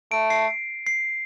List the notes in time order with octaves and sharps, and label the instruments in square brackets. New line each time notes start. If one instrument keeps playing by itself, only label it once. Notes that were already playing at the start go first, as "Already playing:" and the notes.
[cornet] A3 [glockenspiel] D7
[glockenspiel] C7
C7